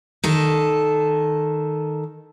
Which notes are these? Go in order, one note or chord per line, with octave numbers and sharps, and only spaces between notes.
D#3 A4